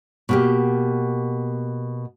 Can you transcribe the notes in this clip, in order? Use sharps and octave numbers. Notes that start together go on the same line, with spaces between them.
B2 A#3 G4